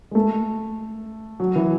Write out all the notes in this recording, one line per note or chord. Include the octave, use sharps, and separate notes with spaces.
G#3
A3
F#3
E3